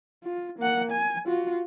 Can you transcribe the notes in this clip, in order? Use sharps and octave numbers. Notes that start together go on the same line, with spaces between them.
F4
A#3 F#5
G#5
F4 F#4